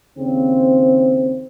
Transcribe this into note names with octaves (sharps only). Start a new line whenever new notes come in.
D#2 C#3 C4